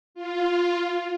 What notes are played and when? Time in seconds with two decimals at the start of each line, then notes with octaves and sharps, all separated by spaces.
0.15 F4